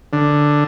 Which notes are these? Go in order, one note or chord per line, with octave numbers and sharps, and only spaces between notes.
D3